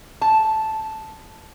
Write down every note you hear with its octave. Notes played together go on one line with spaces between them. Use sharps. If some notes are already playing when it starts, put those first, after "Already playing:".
A5